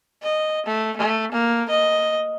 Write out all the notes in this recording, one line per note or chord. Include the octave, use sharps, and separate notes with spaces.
D#5
A3
A3
A#3
D#5